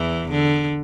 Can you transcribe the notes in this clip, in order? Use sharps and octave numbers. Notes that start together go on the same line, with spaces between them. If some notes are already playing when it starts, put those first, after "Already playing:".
Already playing: E2 E3
D3